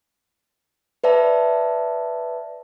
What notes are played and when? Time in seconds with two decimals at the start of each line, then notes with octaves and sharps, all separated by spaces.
1.04 B4 D5 E5 A5